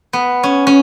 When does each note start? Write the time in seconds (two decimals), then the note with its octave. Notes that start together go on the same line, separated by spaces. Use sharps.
0.13 B3
0.43 C#4
0.67 C#4